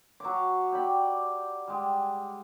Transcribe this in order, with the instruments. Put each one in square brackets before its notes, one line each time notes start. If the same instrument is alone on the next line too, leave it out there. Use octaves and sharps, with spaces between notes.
[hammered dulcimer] F#3 D6
G4 D5 B5
G3 G#3